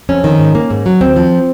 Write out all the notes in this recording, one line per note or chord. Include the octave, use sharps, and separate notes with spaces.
F2 C#4
D#3
G#2
A#3
G#2
F#3
D#2 C4
F3